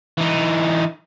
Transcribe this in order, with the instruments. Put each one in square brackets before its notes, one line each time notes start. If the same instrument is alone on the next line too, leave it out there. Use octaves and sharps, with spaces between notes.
[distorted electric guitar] E3 D#4